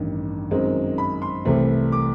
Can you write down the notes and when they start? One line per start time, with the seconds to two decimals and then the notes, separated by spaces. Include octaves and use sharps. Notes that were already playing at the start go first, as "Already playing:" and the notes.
Already playing: A1 G2 D#3
0.51 F#2 D#3 G#3 C4
0.98 B5
1.22 C6
1.45 C2 C3 E3 A3 C4
1.92 D6